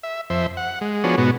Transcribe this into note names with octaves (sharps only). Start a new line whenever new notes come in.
E5
F2 C5 E5
F#5
G#3
F3 B3 D4 F#4 G#4 C#5
G#2 B2 B3 F#4